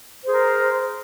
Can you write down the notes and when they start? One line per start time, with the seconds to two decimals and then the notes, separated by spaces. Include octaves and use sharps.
0.23 C5
0.27 G#4
0.31 A#4